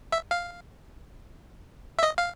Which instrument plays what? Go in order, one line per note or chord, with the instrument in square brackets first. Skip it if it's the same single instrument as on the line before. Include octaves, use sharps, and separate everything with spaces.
[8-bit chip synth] E5
F5
E5
D#5
F5